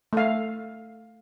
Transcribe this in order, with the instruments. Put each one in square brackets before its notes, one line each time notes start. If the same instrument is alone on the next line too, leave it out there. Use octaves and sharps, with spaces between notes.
[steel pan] A3 F5